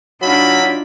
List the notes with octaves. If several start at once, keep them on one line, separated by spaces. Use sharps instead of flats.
F#3 A#3 D4 D#4 F4 E5 B5